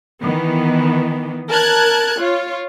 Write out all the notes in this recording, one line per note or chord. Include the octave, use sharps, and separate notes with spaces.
D#3 E3 B3
A#4 A5 F#6 G#6
F4 C#5